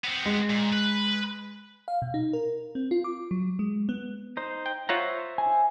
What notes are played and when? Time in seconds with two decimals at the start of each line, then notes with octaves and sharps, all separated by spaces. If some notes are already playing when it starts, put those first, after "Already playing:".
0.04 B3 C4
0.26 G#3
0.50 A#2
0.73 B4
1.88 F5
2.02 B2
2.14 D#4
2.33 A#4
2.75 C4
2.91 F4
3.04 D6
3.31 F#3
3.59 G#3
3.89 B3
4.37 D#4 C5
4.66 G5
4.89 F4 C5 C#5 E5 F#5 A#5
5.38 G#5